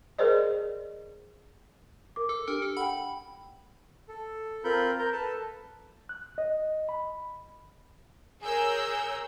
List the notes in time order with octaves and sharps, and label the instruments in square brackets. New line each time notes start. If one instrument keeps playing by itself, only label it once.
[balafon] G#4 A#4 C5 D5 D#5
[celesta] A#4 D6
[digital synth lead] A4
[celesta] D4 G4 [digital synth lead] A#4
[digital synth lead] A4
[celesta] F#5 G5 [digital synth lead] B5
[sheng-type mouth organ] A4
C4 F4 A#4 B5 G6
A#4 A#5 G6
A4 B4 A5
[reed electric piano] F#6
D#5
B5
[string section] G#4 A#4 C#5 E6 G6